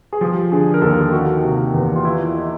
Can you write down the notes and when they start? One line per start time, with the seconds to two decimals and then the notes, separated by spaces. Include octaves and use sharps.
0.13 G#4
0.21 F3 G4
0.52 D3 G#4
0.74 A#4
0.82 D#2 A4
1.12 D#3 F#4
1.43 C3
1.74 E2
1.95 F4
2.05 E3 E4
2.35 D#4